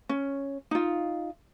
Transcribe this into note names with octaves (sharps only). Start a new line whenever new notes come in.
C#4
D#4 F4